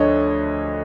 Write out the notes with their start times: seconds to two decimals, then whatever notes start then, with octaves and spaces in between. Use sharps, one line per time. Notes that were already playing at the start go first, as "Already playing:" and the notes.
Already playing: D2 D3 F3 A3 D4 C#5 D#5